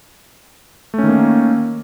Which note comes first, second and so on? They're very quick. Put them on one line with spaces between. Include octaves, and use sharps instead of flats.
A3 C#4 D#3 A#3